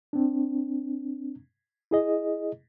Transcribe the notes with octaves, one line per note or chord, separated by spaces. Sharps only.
C4 D4
E4 G#4 D#5